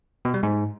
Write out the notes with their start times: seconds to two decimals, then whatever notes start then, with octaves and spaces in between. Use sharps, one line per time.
0.25 B2
0.34 G3
0.43 G#2